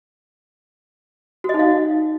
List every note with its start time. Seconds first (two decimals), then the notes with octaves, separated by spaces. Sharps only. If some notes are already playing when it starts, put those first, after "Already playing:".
1.44 F#4
1.49 D#5
1.54 D#4
1.59 F5